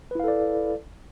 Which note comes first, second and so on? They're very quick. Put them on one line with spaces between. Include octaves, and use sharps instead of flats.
B4 E4 F5 A4 D5